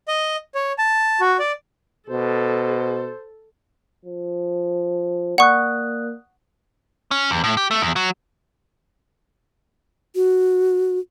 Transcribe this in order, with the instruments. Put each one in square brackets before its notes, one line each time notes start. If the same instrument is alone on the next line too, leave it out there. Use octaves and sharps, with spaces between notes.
[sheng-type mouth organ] D#5
C#5
A5
F#4
D5
[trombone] B2 [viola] A4 [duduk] C5
[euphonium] F3
[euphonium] A#3 [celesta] D5 D#6 F#6 [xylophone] F#5 C#6
[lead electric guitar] C#4
E2
A2
G4
A3
E2
F#3
[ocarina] F#4